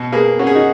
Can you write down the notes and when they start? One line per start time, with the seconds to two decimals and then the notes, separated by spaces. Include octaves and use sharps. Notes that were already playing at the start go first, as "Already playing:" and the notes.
Already playing: B2
0.12 A#3 G#4 B4
0.39 C#4 F#4
0.47 G#4
0.55 D#4 F#4